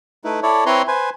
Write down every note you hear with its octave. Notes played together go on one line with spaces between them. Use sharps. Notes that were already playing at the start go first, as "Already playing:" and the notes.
A3 D#4 E4 B4
E4 A4 C#5 D5
C4 E4 B4 C#5 A#5 C6
B4 C5 G#5